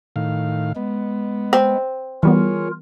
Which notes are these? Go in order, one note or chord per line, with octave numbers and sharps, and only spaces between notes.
A2 D#3 F5
G#3 B3
C4
E3 G3 B3 F4 G#4 A#4 C#5